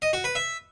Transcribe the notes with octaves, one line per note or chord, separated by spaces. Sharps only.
D#5
F#4
B4
E5